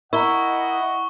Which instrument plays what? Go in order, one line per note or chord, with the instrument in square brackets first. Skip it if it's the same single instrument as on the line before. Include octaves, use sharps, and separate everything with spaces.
[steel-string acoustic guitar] E4 [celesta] A#4 A#5 [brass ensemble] D#5 F#5 [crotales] C#6 G7